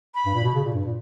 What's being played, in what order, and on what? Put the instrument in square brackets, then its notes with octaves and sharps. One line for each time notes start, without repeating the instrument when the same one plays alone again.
[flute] B5
[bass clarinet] G2
A#2
B2
C#3
A#2
G2
A#2